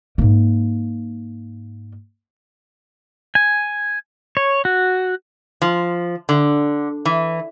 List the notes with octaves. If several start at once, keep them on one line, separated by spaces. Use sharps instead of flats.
G#2 A#3
G#5
C#5
F#4
F3
D3
E3